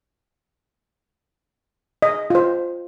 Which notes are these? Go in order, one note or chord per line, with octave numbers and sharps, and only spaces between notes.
D#5
F4 C5